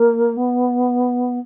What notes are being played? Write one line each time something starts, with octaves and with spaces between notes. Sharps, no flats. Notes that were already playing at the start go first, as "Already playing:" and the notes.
Already playing: A#3
B3